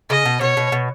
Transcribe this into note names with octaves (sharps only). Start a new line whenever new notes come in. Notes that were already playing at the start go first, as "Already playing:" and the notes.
C#3 D#5
B2
B2 C#5
B2
B2